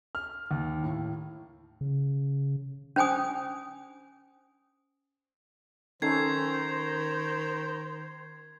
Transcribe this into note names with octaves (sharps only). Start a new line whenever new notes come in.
F6
D#2
A2
C#3
C#4 C5 G5 G#5 D#6
D#3 C#4 D#4 A4 C5 G#6 C7